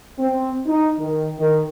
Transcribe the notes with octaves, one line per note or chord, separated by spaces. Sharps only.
C4
D#4
D#3
D#3